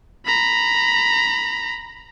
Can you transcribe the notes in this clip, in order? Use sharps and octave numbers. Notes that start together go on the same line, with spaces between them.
A#5 B5